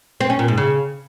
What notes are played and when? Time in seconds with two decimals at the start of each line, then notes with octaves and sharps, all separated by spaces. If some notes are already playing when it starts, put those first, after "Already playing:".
0.20 C4
0.30 C#4
0.39 A#2
0.48 G#2
0.58 C#3